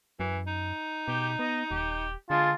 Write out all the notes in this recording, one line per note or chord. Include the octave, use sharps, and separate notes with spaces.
F#2 E3
D#4
B2 G4
B3 D#5
D#1 G4
D3 G#3 F4 A5